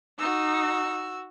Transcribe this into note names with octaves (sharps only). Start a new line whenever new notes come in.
D#4 F#4 E6